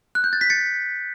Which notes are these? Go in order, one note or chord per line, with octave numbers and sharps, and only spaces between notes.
F#6
G6
A6
B6
A6 C#7